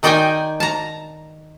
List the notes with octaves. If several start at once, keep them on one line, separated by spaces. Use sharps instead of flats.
D#3 D#4 D5 D#5 G5 G#5
A5 A#5